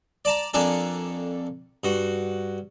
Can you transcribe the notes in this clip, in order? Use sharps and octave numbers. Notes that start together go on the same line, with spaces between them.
D5 A5 A#5
F2 A#3 D4 A4 G#5
G2 F#4